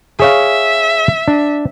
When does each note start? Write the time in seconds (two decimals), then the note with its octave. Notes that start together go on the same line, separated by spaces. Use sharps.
0.20 G#4 C#5 E5 F5
1.28 D4